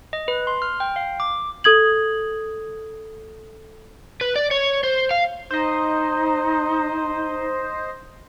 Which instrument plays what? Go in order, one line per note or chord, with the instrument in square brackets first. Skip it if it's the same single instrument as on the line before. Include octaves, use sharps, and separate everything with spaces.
[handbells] D#5
B4
C6
F6
G5
F5
D6
[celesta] A4 D#6 G#6 F#7
[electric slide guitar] B4
D5
C#5
C5
F5
[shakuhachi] D#4 [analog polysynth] C5 D#5